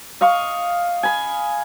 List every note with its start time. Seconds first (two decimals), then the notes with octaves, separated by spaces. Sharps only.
0.21 D#5 F5 C#6
1.03 G#5 B5